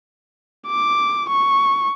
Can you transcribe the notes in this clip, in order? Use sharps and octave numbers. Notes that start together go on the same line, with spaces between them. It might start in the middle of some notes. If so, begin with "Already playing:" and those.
D6
C#6